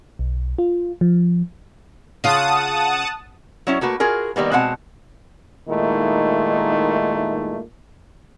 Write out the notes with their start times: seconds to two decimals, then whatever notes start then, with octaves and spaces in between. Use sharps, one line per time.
0.19 B1
0.58 F4
1.01 F3
2.24 C#3 F4 F#5 A5 D#6
3.67 F#3 C#4 E4
3.81 A3 A#3 F#4 B4
4.00 F4 F#4 G#4 A#4
4.36 D#3 G3 A#3 B3
4.52 B2 G#3 C4 F#5 A5
5.68 A#2 D#3 G#3 A3 D#4 E4